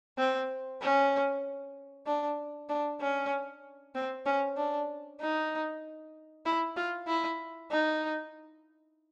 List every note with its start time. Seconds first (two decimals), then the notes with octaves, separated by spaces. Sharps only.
0.18 C4
0.82 C#4
2.07 D4
2.69 D4
3.01 C#4
3.95 C4
4.26 C#4
4.57 D4
5.20 D#4
6.46 E4
6.77 F4
7.07 E4
7.71 D#4